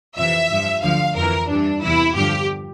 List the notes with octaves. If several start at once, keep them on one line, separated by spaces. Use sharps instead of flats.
F2 C3 E3 E5
G2 F3
D2 D3 F3 F5
F2 E3 A#4
G2 E3 D4
E2 C3 E3 E4
G2 D3 F3 G4